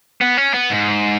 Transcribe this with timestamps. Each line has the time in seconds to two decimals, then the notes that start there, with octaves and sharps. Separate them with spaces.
0.21 B3
0.38 C#4
0.54 B3
0.70 G#2